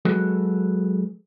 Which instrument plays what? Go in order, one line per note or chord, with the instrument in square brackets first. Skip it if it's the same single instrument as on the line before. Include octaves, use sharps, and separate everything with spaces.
[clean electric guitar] F#3 G#3 F#4 A4 B4